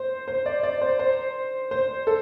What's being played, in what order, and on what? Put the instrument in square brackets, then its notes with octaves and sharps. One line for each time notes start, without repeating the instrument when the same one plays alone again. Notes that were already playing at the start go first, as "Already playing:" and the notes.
Already playing: [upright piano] C5
C5
D5
D5
C5
C5
C5
A4